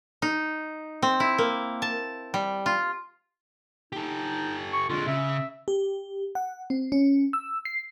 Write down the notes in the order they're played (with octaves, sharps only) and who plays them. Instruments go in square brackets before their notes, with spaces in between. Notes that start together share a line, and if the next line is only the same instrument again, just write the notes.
[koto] D#4
C4
E4
A#3
A5
G3
F4
[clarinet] D#4 [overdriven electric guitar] G4 A4
[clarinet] C#6
[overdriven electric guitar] D3 G#3 [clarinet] F4
[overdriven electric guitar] C#3 [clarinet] E5
[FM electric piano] G4
F#5
C4
C#4
E6
C7